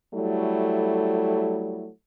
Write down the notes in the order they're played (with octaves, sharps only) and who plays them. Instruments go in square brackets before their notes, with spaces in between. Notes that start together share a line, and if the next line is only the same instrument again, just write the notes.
[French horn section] F#3 G3 A3 E4 A4